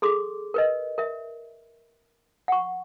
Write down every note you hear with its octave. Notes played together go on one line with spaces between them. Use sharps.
G#4 A4 C6 D6
A#4 B4 D#5
A#4 E5
F#5 C#6